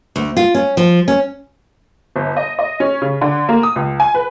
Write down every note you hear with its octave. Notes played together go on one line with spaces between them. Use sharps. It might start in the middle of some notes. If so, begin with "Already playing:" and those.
D2
F4
C#4
F3
C#4
G1
D#5
D#5
C#4
C#3
D3
A#3
D#6
C#2
G#5
B4